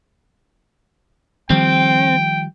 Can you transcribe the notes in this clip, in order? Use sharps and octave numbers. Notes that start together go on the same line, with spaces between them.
D#3 F3 G3 C4 G5